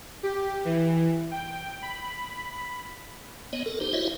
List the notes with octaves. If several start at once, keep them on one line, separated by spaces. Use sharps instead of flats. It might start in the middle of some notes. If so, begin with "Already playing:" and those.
G4
E3
G5
B5
B3 C#5 D#5
A4 A#4
D#4 G4 C5
E4 F#4 C5 C#5 D#5 E5